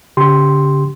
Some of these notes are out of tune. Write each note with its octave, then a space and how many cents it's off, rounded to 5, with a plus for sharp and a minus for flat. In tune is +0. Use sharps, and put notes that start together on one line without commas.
D3 -45 G4 +0 C6 +0